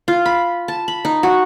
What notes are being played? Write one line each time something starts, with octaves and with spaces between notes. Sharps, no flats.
F4
B5
A5
B5
D#4
F#4